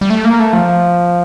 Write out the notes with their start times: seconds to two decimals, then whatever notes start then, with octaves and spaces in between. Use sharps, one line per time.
0.01 G3
0.10 A3
0.25 A#3
0.40 A3
0.53 F3